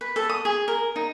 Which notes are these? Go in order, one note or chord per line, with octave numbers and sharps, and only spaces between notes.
B4
A4
D#6
G#4
A#4
D#4